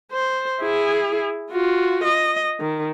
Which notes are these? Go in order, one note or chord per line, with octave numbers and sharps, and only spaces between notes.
C5
E4 G#4
F4 F#4
D#5
D#3